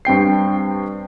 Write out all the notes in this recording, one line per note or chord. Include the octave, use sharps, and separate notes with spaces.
G2 C4 G5 C7